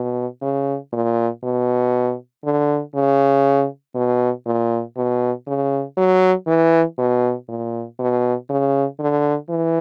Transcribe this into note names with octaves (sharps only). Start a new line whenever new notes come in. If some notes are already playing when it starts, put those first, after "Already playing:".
Already playing: B2
C#3
A#2
B2
D3
C#3
B2
A#2
B2
C#3
F#3
E3
B2
A#2
B2
C#3
D3
E3